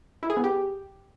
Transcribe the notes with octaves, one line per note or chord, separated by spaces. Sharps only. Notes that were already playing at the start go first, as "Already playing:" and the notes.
E4
G#4
B3
G4